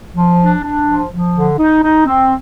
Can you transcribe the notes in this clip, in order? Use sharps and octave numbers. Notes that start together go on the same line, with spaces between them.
F3
D4
D4
F3
F3
D3
D#4
D#4
C4